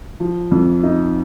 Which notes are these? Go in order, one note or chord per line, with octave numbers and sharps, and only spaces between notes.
F3
F2
D#4